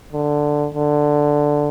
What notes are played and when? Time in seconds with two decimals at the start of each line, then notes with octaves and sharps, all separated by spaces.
0.13 D3
0.74 D3